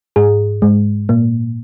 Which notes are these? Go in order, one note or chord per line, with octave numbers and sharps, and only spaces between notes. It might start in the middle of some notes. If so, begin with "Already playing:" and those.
G#2 G#4
G#2 G#3
A#2 A#3